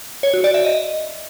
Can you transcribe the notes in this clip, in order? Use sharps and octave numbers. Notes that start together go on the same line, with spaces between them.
C#5
F#4
D5
E5
D#5